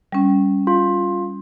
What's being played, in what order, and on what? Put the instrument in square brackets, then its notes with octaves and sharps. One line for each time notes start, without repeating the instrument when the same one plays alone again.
[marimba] G3 C#4
[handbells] F4